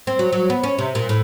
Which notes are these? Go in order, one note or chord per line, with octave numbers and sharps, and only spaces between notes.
C4
F#3
F#3
B3
C#4
C3
A#2
A2